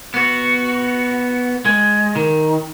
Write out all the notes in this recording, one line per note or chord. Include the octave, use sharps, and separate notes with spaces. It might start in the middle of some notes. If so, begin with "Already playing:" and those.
B3 F#4
G#3
D#3